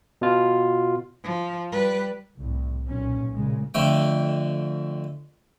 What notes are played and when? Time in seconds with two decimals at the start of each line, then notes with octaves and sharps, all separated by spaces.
0.21 B2 F4
1.24 F3
1.72 G3 B4
2.37 C2 A2
2.86 B1 A#2 C#4
3.36 A#2 C#3 G#3
3.74 F2 D3 A3 G5